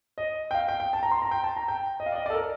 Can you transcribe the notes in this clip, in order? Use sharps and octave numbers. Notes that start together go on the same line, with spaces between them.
D#5
G5
F5
G5
G5
A5
A#5
C6
A#5
G5
A5
A#5
G5
D#5
F5
D5
D#5
D5
A4
A#4